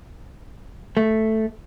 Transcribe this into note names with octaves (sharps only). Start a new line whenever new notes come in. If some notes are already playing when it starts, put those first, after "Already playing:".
A3